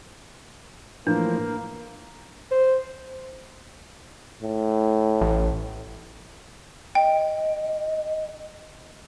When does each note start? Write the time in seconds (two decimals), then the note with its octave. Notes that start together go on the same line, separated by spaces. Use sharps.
1.07 A2 E3 F3 A#3 D4
2.51 C5
4.43 A2
5.21 A1
6.95 D#5 G5